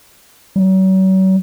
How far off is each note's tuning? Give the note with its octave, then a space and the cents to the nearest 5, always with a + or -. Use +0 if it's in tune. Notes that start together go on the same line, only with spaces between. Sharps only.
F#3 +40